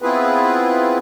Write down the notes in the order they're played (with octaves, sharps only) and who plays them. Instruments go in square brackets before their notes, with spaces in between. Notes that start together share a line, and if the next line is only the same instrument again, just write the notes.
[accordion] B3 C4 E4 F4 G#4 B4